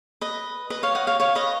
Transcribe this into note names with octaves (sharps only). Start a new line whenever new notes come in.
B4 D#5
B4 D#5
C#5 F5
D#5 F#5
C#5 F5
C#5 F5
B4 D#5